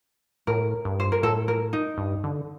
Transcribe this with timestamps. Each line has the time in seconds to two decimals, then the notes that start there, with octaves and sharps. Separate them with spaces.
0.47 A2 A#4
0.85 G2
1.00 C5
1.12 A#4
1.23 A2 A4
1.48 A#4
1.73 D#4
1.98 G2
2.24 D3